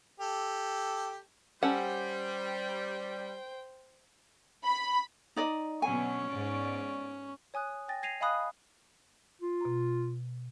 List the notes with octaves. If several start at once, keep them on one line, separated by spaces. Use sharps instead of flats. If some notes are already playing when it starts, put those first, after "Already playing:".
G4 A4
G3 C#4 A4 C5 F#5 G5
B5
D#4 D5 D#5
B2 D3 F#3 C#4 G#5 C#6
G#2 B3 D5
C#5 G#5 D#6 F#6
D#6
G5 G#5 A6 A#6
G#6 A#6 C7 D#7 F7
D#5 F5 G#5 B5 D#6 F#6
F4
B2 A#5